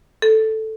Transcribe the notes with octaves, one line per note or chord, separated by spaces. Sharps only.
A4